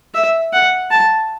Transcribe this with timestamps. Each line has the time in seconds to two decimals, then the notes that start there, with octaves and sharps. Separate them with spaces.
0.14 E5
0.53 F#5
0.91 A5